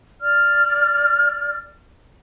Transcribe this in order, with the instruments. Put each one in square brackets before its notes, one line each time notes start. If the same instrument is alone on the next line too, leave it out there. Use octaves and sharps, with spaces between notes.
[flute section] D5 F6